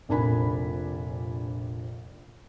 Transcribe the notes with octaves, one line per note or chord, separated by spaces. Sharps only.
F1 A#1 D4 A#4 G#5 B5